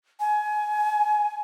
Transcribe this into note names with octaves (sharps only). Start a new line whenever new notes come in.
G#5